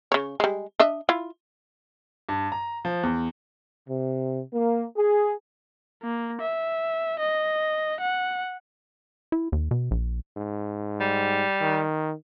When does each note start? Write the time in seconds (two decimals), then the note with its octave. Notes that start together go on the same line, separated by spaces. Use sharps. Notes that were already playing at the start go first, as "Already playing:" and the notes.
0.12 C#3 C#5
0.40 G3 G#3
0.80 D4 D#5 E5
1.09 E4 F4
2.29 G2
2.52 A#5
2.85 F3
3.03 E2
3.89 C3
4.53 A#3
4.97 G#4
6.03 A#3
6.41 E5
7.19 D#5
8.01 F#5
9.32 E4
9.52 D#2
9.71 B2
9.91 A#1
10.37 G#2
11.00 G3
11.61 D#3